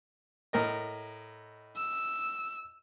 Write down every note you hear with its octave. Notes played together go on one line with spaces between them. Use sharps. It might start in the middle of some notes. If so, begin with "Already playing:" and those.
A2 A#4 D#5
E6